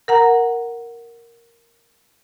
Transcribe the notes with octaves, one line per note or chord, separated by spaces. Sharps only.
A#4 F#5 A#5